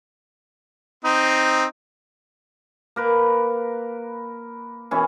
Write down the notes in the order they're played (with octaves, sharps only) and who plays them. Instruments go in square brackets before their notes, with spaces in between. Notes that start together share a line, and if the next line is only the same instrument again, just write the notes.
[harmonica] C4 D#4
[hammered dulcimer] A#3 A#4 B4
B2 E3 C#4 E4